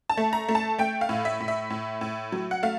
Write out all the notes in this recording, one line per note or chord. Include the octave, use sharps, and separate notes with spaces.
A5
A3
A#5
A3
A5
A3 G5
F5
A2
E5
A2
E5
A2
A2
F#3
F#5
A3 F5